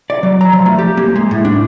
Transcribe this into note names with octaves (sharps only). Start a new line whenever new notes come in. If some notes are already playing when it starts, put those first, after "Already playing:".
D5
F#3
A#5
F3
A3
G4
A#3
G#3
A2
D4